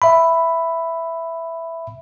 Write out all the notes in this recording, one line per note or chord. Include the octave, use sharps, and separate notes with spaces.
E5 B5